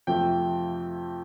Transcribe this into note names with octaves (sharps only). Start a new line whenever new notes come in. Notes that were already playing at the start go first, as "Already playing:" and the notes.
F2 C3 F3 A3 G5